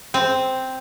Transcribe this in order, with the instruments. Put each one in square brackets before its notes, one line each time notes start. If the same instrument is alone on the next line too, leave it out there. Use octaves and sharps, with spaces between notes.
[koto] C4